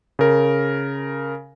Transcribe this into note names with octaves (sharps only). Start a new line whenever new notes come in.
C#3 A#4